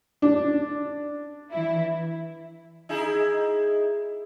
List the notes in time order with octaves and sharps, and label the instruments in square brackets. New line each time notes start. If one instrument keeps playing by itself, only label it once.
[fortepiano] D4
[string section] E3 E4
[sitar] D#4 E4 G#4